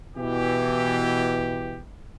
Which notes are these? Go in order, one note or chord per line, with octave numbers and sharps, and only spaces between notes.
B2 E3 G4